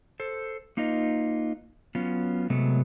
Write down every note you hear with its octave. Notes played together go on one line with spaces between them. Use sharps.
A4 C5
A#3 D#4 F4 B4 D#5
F#3 B3 C#4 F4
C3 F#3 G#3 A3 B3